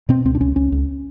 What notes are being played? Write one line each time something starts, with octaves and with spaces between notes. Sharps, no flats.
B2 C4
C#2 C4
D4
C#2 C#4
C#2 C#4
C#2